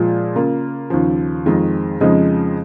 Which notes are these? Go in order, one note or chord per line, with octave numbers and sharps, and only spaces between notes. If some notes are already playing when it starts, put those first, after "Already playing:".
Already playing: A#2 F3 G#3 F4
C#3 A#3 F4
D#2 C#3 F3
F2 D#3 G#3 F4
F2 C#3 F3 G#3 D#4